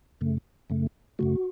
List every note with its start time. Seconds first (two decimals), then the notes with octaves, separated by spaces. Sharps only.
0.21 F#2 C#3 A3
0.70 F#2 C#3 A3
1.19 F#2 C#3 A3 F#4